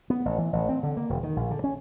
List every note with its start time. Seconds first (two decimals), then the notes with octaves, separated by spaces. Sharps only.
0.10 B3
0.25 A1
0.38 E3
0.53 A1
0.69 C4
0.83 D3
0.97 A#3
1.10 E1
1.23 D#3
1.36 A#1
1.51 D3
1.64 C#4